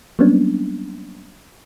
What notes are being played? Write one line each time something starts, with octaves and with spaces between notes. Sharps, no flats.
F#3 G3 A#3 B3 C#4 D4